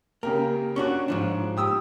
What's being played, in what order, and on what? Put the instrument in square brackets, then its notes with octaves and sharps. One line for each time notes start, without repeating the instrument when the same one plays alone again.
[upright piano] C#3 G4 A#4 [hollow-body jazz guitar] A#3
[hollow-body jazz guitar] C#4 D4 F#4 [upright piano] C#6 D6 F#6
[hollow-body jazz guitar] G#2 F3 D4
[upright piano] G4 D#6 E6